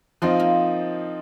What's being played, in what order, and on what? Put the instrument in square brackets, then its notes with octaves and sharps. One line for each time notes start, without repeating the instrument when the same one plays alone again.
[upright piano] F3 C4 D#4 [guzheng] F4
[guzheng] A#3